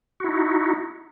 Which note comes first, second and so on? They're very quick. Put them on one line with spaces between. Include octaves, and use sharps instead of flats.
F#4 E4 D#4